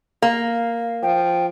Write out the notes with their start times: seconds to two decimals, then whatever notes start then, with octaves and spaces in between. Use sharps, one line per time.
0.22 A#3 F5
1.03 F3 G5